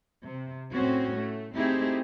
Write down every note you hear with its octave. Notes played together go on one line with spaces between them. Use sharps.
C3
A2 C4 C#4 F#4
A3
A3 C4 D#4 E4 G4 G#4